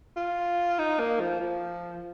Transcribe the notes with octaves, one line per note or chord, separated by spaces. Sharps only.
F4
D#4
A#3
F3
F3